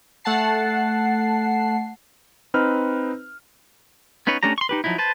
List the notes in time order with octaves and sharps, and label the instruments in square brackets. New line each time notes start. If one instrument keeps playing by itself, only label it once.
[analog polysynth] A3 F#5 A5 C7
[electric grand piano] C4 D#4 B4 F6
[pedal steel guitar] B3 C#4 D#4 B4 C#5
A3 C#4 D4 G4 A#5
C6 C#6
D#4 G4 B4
F3 F#3 D#4 E4
B4 C5 A5